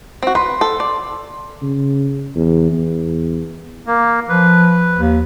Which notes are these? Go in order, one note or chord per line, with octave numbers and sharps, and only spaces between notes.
C4 F#4
B4 C6
A4
D5
C#3
E2
E2
A#3
F3 B4
D#2